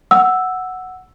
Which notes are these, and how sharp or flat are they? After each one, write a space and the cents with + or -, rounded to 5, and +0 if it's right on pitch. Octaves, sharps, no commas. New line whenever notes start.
F#5 +0 E6 +0